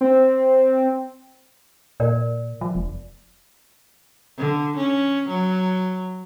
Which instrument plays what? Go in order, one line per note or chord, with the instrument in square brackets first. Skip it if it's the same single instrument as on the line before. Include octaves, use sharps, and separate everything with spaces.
[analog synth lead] C4
[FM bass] A#2 [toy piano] A#4 D5
[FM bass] F3
F1
[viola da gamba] D3
C#4
F#3